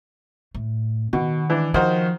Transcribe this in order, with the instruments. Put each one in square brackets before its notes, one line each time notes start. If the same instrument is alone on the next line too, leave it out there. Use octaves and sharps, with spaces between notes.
[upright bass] A2
[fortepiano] B2 [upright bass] D#3
[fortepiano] E3 D4
[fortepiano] D#3 F#4 C5 [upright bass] F3